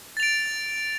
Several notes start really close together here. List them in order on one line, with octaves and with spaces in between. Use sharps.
A6 F7 D7